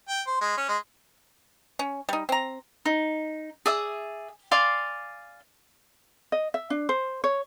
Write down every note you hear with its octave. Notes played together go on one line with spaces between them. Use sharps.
G5
C5
G#3
C#4
G#3
C#4
G3 D#4
C4 A#5
D#4
G#4 D5 E5 D#6
D5 F5 G#5 C6
D#5
E5
D4
C5
C#5